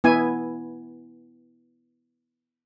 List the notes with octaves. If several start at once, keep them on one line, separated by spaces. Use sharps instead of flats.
B3 E4 G#5